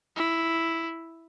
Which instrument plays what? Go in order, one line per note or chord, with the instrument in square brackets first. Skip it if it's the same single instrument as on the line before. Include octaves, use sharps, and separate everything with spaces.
[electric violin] E4